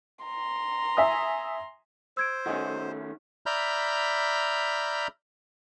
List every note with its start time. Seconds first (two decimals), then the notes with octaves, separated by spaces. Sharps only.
0.25 A#5 C6
0.97 E5 G#5 D#6
2.17 C5 E6 G#6 D7
2.46 D#3 A3 C#4 F#4 D#5 G#5
3.46 D5 E5 A#5 B5 F6 G6